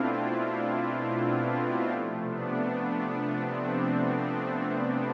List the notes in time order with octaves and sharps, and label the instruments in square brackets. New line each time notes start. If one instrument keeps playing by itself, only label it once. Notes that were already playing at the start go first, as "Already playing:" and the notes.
Already playing: [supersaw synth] B2 A3 C4 D4 E4 F4
C4
B3
C4
C3 F3 A3
B3 D4
C4